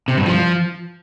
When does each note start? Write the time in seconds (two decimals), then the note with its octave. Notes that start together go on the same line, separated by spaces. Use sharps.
0.08 C3
0.17 G2
0.26 F3